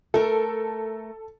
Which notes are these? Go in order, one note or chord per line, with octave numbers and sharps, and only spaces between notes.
A3 A4 A#4